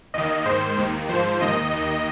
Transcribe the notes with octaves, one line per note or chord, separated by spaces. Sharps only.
D#2 D#3 D#5
G#2 D#3 C5
D#2 D#3
G#2 F3 C5
D#2 D#3 D#5
D#2 D#3